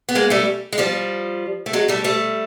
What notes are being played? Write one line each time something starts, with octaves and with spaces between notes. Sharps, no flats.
B3
G#3 A#3
G3 A3
G#3
F3 G3
A3
F#3 G#3
G3 A3
G3 A3